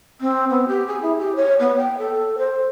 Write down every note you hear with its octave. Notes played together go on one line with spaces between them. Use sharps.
C4
B3
G4
G#4
E4
G4
C#5
B3
G5
A4
C5